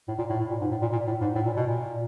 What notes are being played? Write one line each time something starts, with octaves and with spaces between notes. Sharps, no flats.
A2
A#2
A2
A2
A#2
G#2
A2
A#2
A#2
A2
G#2
A2
A#2
B2
A#2